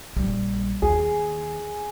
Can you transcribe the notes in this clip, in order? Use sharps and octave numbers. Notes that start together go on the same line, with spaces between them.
A#1 G3
D#2 G#4